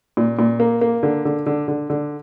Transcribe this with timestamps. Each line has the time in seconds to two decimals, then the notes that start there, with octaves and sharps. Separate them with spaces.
0.17 A#2
0.39 A#2
0.60 A#3
0.81 A#3
1.03 D3
1.25 D3
1.46 D3
1.68 D3
1.90 D3